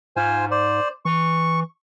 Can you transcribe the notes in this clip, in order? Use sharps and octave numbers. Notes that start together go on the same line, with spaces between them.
G#2 F4 C5 G#5
C5 D5
E3 C#6